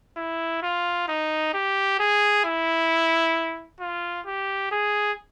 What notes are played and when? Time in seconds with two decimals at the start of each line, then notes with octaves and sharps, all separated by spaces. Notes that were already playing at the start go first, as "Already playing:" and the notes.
0.17 E4
0.63 F4
1.08 D#4
1.54 G4
1.99 G#4
2.45 E4
3.80 F4
4.26 G4
4.71 G#4